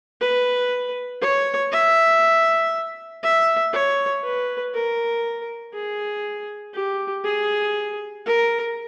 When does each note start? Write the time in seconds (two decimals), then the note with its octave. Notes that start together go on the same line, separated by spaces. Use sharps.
0.21 B4
1.22 C#5
1.72 E5
3.24 E5
3.73 C#5
4.24 B4
4.74 A#4
5.74 G#4
6.75 G4
7.25 G#4
8.26 A#4